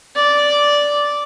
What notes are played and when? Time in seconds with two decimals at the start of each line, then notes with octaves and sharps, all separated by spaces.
0.15 D5